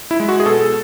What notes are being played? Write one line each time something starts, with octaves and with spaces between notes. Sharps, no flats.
E4
G#3
F#4
G#4
B2 A4